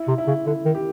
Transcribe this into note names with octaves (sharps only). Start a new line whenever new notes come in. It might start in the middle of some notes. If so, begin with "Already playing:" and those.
Already playing: E4
C3
E4
C#3
D3 E4
D#3
G4